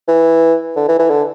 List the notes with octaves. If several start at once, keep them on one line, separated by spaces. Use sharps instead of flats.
E3
D3
E3
E3
D3